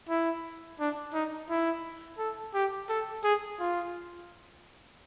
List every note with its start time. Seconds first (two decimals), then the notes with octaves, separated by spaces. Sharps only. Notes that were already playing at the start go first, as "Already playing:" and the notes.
0.09 E4
0.80 D4
1.14 D#4
1.50 E4
2.19 A4
2.54 G4
2.89 A4
3.24 G#4
3.60 F4